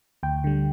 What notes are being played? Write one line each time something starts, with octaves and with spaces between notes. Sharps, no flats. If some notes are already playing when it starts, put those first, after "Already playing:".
D2 G5
D3 G3